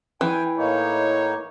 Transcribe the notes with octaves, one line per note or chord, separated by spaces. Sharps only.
E3 G5 G#5
A2 A#3 D#4 C#5